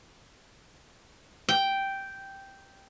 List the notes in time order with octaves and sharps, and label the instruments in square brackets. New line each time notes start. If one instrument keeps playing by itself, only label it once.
[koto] G5